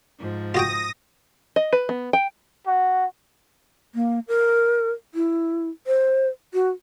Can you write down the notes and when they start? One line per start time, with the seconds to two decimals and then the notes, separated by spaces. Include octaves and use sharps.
0.19 G#2 F3
0.54 F4 F#4 G5 D#6 A#6
1.56 D#5
1.73 B4
1.89 B3
2.13 G5
2.66 F#4
3.95 A#3
4.28 A#4
5.14 E4
5.87 C5
6.54 F#4